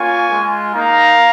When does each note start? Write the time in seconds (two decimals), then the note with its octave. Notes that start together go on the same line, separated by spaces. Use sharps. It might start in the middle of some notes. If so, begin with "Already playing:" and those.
Already playing: A#3 C#4 F4 G#5 C#6
0.31 G#3 F4
0.74 A#3 D#4 F5 A#5